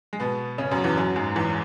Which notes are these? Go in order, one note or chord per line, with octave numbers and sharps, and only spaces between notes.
G#3
B2 B3
C#3 C#4
F#2 F#3
E2 E3
F#2 F#3
G#2 G#3
E2 E3